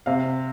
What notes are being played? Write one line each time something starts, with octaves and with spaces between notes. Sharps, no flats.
C3 F5